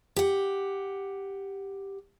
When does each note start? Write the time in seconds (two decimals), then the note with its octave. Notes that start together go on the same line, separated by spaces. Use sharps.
0.16 G4 F#5